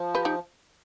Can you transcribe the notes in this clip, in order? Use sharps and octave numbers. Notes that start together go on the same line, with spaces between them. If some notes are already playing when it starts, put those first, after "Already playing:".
Already playing: F3
G4 B4
D#4 G4